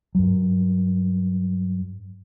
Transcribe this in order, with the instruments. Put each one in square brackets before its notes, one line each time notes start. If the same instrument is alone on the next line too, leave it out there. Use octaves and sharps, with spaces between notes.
[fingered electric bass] G2 F#3